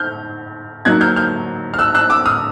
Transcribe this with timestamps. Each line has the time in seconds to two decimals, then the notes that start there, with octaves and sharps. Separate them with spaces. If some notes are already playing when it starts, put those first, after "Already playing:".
Already playing: F6 G6
0.85 F#3 A#3 D#4 F#6 G#6
1.01 F6 G6
1.16 F6 G6
1.74 F6
1.79 E6 F#6
1.95 E6 F#6
2.10 D6 E6
2.26 D#6 F6